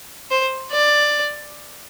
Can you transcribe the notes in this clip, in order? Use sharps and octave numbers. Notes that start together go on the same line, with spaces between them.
C5
D5